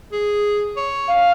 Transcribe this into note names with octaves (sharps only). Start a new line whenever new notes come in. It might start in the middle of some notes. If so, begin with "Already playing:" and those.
G#4
C#5
F5